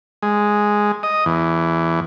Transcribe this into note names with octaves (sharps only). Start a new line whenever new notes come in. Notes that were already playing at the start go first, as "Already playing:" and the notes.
G#3
D#5
E2